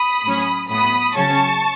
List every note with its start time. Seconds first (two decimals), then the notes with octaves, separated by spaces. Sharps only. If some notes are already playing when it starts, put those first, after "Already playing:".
Already playing: B5 D#6
0.24 A2 F#3 C#4
0.70 A2 F#3 B3 B5 D#6
1.16 C#3 F#3 C#4 A5 C#6